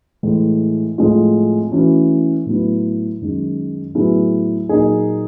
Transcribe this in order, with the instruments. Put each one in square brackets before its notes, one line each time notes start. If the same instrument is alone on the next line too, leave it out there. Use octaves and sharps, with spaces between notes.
[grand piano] A2 E3 G#3
A2 F3 G#3 C4 F4
E3 A3 C#4 F#4
A2 F#3 B3 E4
F#2 D#3 G#3
A2 F#3 B3 E4 G#4
A#2 F#3 A#3 D#4 G#4